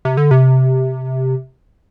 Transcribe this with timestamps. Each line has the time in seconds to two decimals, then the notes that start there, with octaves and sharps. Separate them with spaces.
0.05 C3
0.17 D3
0.31 C3